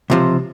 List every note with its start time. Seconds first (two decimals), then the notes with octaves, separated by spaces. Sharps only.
0.10 C#2 C3 F3